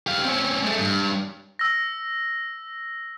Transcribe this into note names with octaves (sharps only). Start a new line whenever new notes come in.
G4 F5
C4 C#4
G#3 A3
G2
E6 A#6